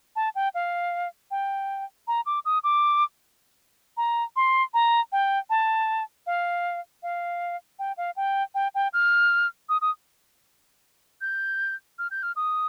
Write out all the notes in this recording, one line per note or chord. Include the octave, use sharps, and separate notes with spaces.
A5
G5
F5
G5
A#5
D6
D#6
D6
A#5
C6
A#5
G5
A5
F5
F5
G5
F5
G5
G5
G5
F6
D#6
D#6
G6
F6
G6
F6
D#6